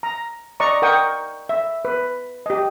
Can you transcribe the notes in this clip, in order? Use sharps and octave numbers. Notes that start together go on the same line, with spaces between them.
A#5
D5 D#5 A#5 C#6
A#4 F#5 G5 C#6 D#6
E5
B4
G4 D#5